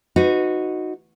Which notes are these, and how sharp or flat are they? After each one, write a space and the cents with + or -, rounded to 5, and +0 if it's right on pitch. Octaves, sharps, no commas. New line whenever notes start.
D#4 +0 F#4 -10 B4 +30